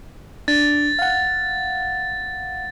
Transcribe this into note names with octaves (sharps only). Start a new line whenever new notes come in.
D4 A6
F5 F#5